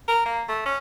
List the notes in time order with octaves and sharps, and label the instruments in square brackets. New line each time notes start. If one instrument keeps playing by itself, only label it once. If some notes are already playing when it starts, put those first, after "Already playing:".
[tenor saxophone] A#4
A#3
A3
C#4